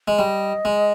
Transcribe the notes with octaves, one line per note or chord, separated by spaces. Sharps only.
G#3
G3 D#5
G#3